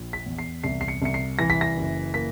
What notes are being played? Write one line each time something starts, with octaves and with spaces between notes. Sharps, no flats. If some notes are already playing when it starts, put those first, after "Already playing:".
Already playing: A#1
B6
E2
C7
C2 C7
C7
C#7
C2 C#7
C7
E3 A#6
B6
A#6
F#1
A#3 B6